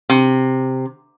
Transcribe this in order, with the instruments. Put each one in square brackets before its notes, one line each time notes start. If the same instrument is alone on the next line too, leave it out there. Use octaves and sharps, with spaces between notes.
[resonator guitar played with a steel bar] C3